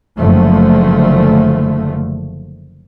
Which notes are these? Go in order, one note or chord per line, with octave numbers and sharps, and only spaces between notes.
F#1 D3 F3 A3